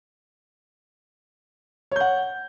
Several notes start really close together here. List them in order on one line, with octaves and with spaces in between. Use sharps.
C#5 G6 F#5